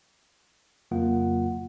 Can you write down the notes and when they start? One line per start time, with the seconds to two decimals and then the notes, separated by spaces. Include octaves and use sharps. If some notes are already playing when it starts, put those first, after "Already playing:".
0.91 F2 C#3 F#3 A#3 F4 F#5